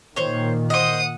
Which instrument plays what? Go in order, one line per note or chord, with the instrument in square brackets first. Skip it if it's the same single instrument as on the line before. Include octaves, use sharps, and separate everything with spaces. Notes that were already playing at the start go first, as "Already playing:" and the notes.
[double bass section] A#2 D#3 [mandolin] C5 C#5
[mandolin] C5 D#5 [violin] F#5 D#6